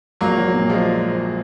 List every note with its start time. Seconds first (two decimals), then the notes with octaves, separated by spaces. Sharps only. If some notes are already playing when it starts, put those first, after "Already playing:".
0.21 A#1 F#3 A#3
0.38 F#3
0.54 A#2
0.70 F3 G#3